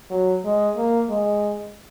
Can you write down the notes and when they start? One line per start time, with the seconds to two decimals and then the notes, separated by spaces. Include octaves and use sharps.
0.11 F#3
0.45 G#3
0.77 A#3
1.10 G#3